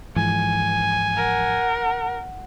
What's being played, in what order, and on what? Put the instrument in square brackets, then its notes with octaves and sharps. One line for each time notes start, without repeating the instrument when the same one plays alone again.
[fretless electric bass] G#2 E3 F3 [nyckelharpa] G#5
[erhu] A#4 [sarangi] F#5